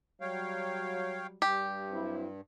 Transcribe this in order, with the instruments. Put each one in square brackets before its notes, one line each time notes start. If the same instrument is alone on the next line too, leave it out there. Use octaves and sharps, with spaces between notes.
[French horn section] F#3 G3 [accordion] C#5 F5 G5
[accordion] G2 [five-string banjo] G4
[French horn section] F#3 C4 E4